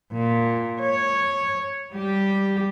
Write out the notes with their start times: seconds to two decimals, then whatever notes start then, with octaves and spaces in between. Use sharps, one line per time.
0.12 A#2
0.81 C#5
1.92 G3 G4